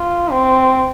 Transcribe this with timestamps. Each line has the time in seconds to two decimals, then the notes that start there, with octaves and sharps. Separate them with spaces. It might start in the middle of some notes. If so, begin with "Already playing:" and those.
Already playing: F4
0.31 C4